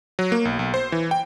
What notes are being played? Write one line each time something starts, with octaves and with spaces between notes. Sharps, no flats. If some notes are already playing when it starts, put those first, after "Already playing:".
F#3
A#3
B1
B1
C5
E3
G5